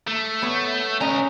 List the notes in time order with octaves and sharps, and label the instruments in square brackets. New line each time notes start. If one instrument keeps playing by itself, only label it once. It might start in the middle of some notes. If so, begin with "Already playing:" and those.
[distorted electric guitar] A3
[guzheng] B3 C#5
[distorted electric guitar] C#2 A#5 [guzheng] C#4 B4 D#5